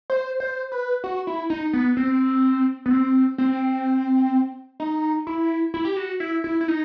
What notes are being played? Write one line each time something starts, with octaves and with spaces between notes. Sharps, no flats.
C5
C5
B4
F#4
E4
D#4
B3
C4
B3
C4
C4
D#4
E4
E4
G4
F#4
E4
E4
E4
D#4